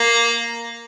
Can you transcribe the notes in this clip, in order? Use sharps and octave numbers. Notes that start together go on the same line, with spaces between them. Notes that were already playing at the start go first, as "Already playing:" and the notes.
Already playing: A#3